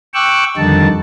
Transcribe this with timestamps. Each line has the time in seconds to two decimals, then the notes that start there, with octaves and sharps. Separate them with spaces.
0.14 G5 C#6 D6 E6 F#6
0.57 F2 D3 D#3 G3 D#4 A5